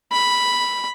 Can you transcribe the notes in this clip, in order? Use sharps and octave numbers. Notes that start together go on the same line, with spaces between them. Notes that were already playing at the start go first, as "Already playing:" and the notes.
B5